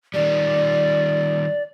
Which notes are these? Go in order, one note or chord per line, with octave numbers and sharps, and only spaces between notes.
D#3 G3 D5